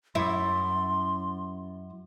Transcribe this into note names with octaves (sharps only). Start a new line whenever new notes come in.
F#2 E4 C6